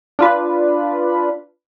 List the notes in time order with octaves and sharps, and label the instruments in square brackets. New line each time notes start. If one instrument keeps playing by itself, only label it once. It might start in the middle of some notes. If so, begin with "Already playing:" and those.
[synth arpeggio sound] D4 F4 B4